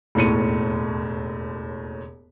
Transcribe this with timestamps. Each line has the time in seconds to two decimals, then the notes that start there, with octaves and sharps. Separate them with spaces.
0.15 E1 D#2 A2 C#7 D#7